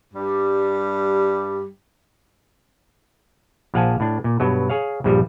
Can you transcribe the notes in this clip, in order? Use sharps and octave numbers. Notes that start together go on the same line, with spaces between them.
G2 G3
A#1 F3 F5 F#5 G#5 A5
A2 D4
A#2
G2 B2 F#3
G#4 C#5 F5
A#1 G2 F3 G3